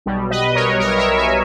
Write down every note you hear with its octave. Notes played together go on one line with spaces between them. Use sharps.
B1 B2 G3
B4 D#5
A#4 C#5
B1 B2 G3 A#4 C#5
C#5 E5
E5 G#5